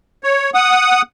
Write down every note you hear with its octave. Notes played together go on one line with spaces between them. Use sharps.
C#5
F#5 D#6